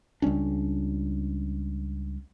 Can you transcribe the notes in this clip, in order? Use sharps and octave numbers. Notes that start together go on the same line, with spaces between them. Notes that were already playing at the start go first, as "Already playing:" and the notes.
C#2 G3 C#4 D4